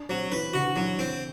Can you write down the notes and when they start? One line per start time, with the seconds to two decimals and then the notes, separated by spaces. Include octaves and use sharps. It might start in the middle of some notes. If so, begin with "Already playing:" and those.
Already playing: D4
0.09 F#3 C4
0.32 E3 B4
0.53 D3 F#4
0.76 E3 F#3
0.99 E3 C4